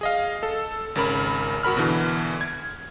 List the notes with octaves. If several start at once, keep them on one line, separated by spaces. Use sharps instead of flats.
G#4 D#5 F5
A4
G#1 C#3 A#4 B5
G#1 F#4 A#4 B5 F6
B2 D3 E3
G#6